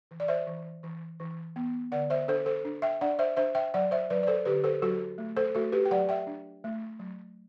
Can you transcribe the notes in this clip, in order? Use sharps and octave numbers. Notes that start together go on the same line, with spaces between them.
E3
D5
C5 E5
E3
E3
E3
B3
D3 D5 F#5
C5 E5
D4 A4 C5
A4 C5
D4
E5 G5
D4 D5 F#5
C5 E5
D4 C5 E5
E5 G5
F#3 D5 F#5
C5 E5
F#3 B4 D5
D5
A4 C5
D3 G4 B4
A4 C5
F#3 F#4 A4
A3
A4 C5
A3 F#4 A4
G4 B4
G5
F#3 D5 F#5
E5 G5
D4
A3
F#3